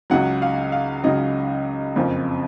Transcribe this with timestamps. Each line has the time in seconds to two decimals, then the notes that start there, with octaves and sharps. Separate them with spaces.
0.10 C#2 C#3 F#3 F#5
0.42 F5
0.72 F5
1.03 C#2 C#3 F#3 D#5
1.96 F#1 F2 C#3 F3